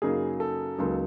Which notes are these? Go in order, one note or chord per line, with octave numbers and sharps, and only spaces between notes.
F#2 C#3 F#3 A#3 D#4 G#4
A4
C#2 C#3 F#3 A#3 D#4